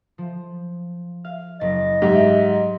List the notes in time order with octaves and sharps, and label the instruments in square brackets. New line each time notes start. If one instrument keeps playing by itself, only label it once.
[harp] F3
F5
[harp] F#1 A6 [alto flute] D#5
[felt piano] G#2 [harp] F#3 G3 E5 [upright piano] G4